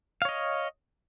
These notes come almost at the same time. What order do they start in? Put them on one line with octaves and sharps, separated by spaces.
F5 C#5 D#5